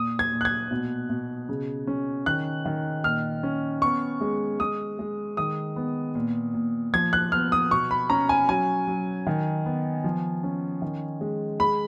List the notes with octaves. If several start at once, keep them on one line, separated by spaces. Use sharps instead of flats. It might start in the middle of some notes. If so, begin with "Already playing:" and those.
Already playing: A#2 D#6
G#6
A#2
F#6
G#6
B2
B2
C#3
C#4
D#3 F#6
D#3
A#2 F6
C#4
B3 C#6
G#3
G#3 D#6
G#3
D#3 D#6
B3
A#2
A#2
F3 G#6
F#6
B3 F6
D#6
B2 C#6
B5
C#4 A#5
G#5
F#3 G#5
F#3
D#3
B3
F3
C#4
D#3
G#3
G#3 B5